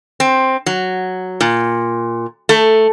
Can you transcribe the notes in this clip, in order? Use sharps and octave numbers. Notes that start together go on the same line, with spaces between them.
C4
F#3
A#2
A3